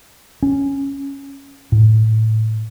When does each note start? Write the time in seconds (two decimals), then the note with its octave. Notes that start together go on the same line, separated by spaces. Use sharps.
0.43 C#4
1.72 A2